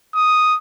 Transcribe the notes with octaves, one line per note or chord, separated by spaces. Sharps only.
D#6